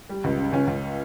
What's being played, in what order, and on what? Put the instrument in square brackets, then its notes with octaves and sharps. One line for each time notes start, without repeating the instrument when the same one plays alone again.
[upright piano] G3
C#2
C#3
C#2 C#4
C#2